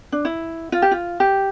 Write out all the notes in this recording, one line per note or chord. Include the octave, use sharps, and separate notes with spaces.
D4
E4
F4
G4
F4
G4